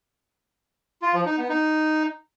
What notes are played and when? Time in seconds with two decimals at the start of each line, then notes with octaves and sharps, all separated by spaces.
1.02 F4
1.14 F3
1.26 D#4
1.38 B3
1.49 D#4